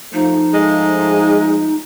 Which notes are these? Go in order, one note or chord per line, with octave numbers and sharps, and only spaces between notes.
F3 A3 D#4
G#3